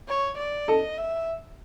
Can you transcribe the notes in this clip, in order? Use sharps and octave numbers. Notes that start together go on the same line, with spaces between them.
C#5
D5
A4 D#5
E5